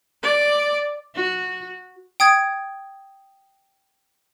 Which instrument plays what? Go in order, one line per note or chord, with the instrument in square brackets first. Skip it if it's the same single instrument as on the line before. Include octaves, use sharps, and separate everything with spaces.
[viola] D5
[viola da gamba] F#4
[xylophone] G5 D#6 G#6